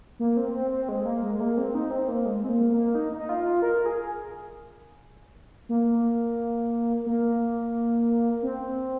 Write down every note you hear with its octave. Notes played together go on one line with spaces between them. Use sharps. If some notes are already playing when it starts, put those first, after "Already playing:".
A#3
C4
C4
C4
G#3
A#3
G#3
A#3
C4
D#4
C4
A#3
G#3
C4
A#3
A#3
D#4
D#4
F4
A#4
G#4
A#3
A#3
C4